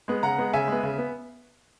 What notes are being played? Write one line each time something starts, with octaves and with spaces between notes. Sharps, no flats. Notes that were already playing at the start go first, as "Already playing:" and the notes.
G#3 B3
C#3 F#5 A#5
G#3 B3
C#3 E5 G#5
G#3 B3
C#3
B3